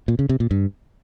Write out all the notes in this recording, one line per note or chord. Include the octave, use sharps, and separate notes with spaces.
A#2
C#3
C3
A#2
G2